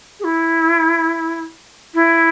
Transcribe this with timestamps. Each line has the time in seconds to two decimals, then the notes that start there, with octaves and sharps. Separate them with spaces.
0.20 G#4
0.24 E4
1.94 E4